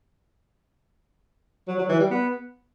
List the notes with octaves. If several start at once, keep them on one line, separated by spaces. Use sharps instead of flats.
F#3
F#3
E3
G3
B3